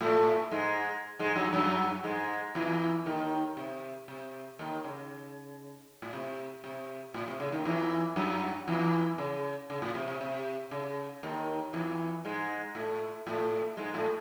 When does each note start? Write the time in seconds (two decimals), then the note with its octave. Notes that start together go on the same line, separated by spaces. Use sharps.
0.01 A2 A3
0.51 G#2 G#3
1.19 G#2 G#3
1.36 F#2 F#3
1.53 F#2 F#3
2.04 G#2 G#3
2.55 E2 E3
3.06 D#2 D#3
3.57 C3
4.08 C3
4.59 D#2 D#3
4.84 C#3
6.02 A2
6.13 C3
6.64 C3
7.14 A2
7.28 C3
7.40 C#3
7.52 D#2 D#3
7.65 E2 E3
8.16 F#2 F#3
8.68 E2 E3
9.18 C#3
9.70 C#3
9.82 A2
9.95 C3
10.08 C3
10.21 C3
10.71 C#3
11.23 D#2 D#3
11.73 E2 E3
12.25 G#2 G#3
12.75 A2 A3
13.27 A2 A3
13.77 G#2 G#3
13.94 A2 A3